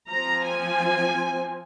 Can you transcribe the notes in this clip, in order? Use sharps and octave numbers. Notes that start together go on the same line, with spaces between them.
F3 C4 A#5
G#5